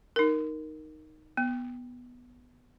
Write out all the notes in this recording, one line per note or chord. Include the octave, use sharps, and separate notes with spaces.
D#4 A#4
B3